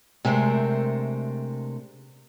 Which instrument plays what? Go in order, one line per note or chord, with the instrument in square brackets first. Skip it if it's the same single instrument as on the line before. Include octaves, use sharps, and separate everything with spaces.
[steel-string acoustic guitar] C3 G#3 A3 C4 D4 A#4